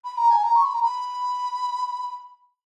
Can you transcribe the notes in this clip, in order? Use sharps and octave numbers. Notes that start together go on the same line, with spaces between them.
B5
A#5
G#5
A#5
C#6
B5
A#5
B5